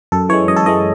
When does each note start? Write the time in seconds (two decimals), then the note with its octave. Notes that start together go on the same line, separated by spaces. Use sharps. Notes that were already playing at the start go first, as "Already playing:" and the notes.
0.12 F#2 A4
0.29 E3 G#3 C#5
0.48 F#2 D#5
0.56 A4
0.66 E3 G#3 D#5